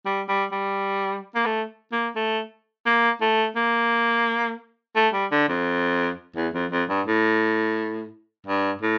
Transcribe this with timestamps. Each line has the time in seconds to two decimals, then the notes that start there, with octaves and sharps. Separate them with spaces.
0.05 G3
0.28 G3
0.52 G3
1.35 A#3
1.45 A3
1.92 A#3
2.15 A3
2.85 A#3
3.21 A3
3.56 A#3
4.96 A3
5.13 G3
5.31 D3
5.49 F2
6.36 E2
6.54 F2
6.71 F2
6.89 G2
7.06 A2
8.46 G2
8.82 A2